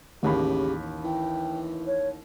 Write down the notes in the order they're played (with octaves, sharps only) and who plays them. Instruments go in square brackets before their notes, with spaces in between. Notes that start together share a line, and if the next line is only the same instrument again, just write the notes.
[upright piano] A1 D#2 B5 [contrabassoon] C#3 [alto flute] G4
[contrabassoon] E3 [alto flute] G5
[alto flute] C#5